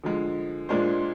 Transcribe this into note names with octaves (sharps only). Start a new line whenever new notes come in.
D3 F3 G#3
A#2 G#3 D4 F4 C5